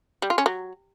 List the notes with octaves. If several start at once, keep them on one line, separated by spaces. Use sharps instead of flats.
G3
F4
C#4
F#3